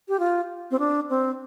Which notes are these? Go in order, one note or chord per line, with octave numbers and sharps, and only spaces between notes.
G4
F4
C4
D4
C4